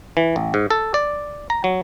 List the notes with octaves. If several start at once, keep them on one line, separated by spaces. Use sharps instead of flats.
E3
A1
G#2
A4
D5
A#5
F#3